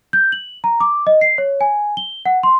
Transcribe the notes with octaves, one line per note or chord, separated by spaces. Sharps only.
G6
F#7
A#5
D6
D#5
C7
C#5
G#5
G7
F#5
C6